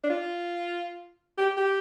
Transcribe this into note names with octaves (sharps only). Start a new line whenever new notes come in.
D4
F4
G4
G4